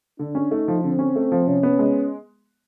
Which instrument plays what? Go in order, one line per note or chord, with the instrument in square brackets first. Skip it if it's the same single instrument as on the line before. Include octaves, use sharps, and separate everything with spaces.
[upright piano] D3 [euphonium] D4
[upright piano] C#4
[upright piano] A3 [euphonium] D#4
[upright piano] F3
[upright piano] D3 [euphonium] C4
[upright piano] C#4
A3
F3
[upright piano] C3 [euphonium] C#4
[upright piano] B3
G#3